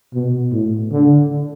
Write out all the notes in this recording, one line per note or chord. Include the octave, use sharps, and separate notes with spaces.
B2
A2
D3